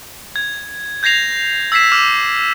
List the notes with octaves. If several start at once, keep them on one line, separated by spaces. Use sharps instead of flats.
G#6
G6 G#6 A#6 C7 F7
E6 G#6 B6 C7 E7
D6 F6 E7